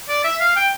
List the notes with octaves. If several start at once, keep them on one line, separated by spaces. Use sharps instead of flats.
D5
E5
F5
G5